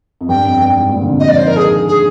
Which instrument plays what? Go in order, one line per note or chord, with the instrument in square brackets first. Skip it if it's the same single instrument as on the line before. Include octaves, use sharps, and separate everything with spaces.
[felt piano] F2
[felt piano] G2 [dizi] G5
[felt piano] F2
G2
G#2
A#2
D3
C3
[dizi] D#5
[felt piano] F3 [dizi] D5
[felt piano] D#3 [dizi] C5
[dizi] A#4
G#4
G#4